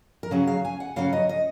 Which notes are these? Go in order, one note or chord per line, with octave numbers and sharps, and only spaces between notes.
A#4
C#3 F#3 C#4 G#4
F5
G#5
F#5
C#3 F#3 C#4 F5
D#5
D#5